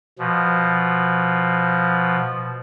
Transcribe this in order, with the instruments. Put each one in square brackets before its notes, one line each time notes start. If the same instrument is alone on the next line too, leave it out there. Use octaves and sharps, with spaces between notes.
[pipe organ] B2 F3